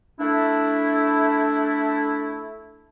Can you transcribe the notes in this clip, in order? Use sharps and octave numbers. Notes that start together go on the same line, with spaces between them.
A3 D4 E4